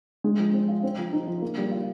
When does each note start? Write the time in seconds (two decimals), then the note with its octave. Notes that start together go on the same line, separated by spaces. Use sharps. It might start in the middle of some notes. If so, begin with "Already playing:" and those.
0.24 G#3
0.38 F3
0.53 C4
0.68 F4
0.83 C4
0.98 F3
1.13 D#4
1.27 F3
1.42 A#3
1.58 G3
1.71 F4